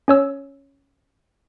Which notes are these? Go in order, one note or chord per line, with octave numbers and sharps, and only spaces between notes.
C#4 C#5 E6